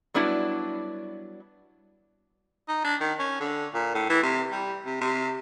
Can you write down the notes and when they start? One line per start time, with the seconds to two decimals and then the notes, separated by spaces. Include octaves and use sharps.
0.14 F#3 G3 B3 D4 E4 F#4
2.68 D#4
2.84 D4
3.01 D#3
3.19 C#4
3.41 D3
3.74 A#2
3.94 A2
4.10 E3
4.23 C3
4.51 G3
4.86 C3
5.01 C3